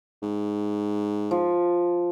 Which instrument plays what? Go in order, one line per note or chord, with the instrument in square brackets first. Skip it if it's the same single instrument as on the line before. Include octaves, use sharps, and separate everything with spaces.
[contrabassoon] G#2
[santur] F3